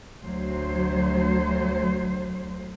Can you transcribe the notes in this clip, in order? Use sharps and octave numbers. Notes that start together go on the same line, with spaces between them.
D2 F#3 C5